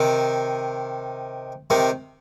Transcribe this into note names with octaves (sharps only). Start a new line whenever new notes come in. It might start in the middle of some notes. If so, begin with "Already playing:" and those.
Already playing: C3 D#3
C3 D#3